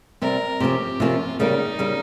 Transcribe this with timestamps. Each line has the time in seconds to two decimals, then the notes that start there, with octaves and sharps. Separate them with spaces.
0.22 C3 G3 C4 A#4
0.60 C3 F3 A#3 C#4 G4
1.00 C3 F3 A#3 C#4 F4
1.39 C#3 G3 A#3 D#4
1.79 C#3 G3 A#3